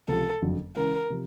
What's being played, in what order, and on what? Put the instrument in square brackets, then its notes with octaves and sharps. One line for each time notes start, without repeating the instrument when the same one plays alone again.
[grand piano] C#2 C3 F3 G#3 [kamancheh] A4
[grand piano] F#1 F2 D3 F#3
[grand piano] C#3 E3 G#3 C#4 [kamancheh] A#4
[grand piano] C3 F3